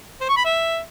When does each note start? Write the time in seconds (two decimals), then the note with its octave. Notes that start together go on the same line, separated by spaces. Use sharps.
0.21 C5
0.29 C#6
0.37 B5
0.45 E5